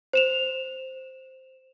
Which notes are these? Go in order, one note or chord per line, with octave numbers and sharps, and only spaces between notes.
C5 E7 F7